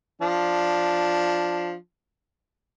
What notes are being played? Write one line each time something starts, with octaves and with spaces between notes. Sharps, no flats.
F3 D4